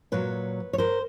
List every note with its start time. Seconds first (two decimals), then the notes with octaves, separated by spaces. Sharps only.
0.12 A#2 F#3 B4 C#5
0.73 C#5
0.78 A#4 C5